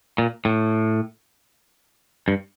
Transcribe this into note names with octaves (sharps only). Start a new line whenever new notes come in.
A#2
A2
G2